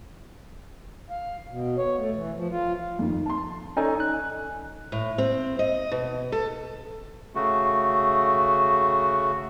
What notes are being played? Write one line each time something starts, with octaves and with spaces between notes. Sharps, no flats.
F5
B2
C#5
A3
E3
F3
F4
F2 D#3
A5 C6
C#4 D#4 A4 D5 G#5
F#6
A2
C4
D#5
B2
A4
C#3 A3 F#4